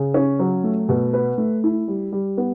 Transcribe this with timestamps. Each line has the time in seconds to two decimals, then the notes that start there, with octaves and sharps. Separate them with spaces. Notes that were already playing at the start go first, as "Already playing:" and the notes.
Already playing: C#3
0.14 C#4
0.39 F#3
0.64 A3
0.89 B2
1.13 B4
1.38 A3
1.64 E4
1.88 G3
2.12 G3
2.37 B3